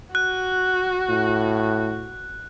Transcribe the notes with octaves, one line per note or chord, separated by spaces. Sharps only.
F#4 F#6
A2